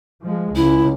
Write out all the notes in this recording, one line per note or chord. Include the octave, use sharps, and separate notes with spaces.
F3 G#3
C#2 E4